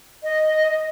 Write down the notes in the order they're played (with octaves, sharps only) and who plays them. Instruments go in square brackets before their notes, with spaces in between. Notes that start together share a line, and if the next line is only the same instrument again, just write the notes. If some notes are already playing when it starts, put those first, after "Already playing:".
[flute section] D#5